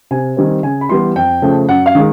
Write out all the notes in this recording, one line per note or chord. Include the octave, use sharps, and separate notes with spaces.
C3 G#5
D#3 G3 C4
C#3 G#5
B5
E3 G3 B3 C6
F2 G5
C#3 F3 A3
F#2 F#5
F5
D#3 G#3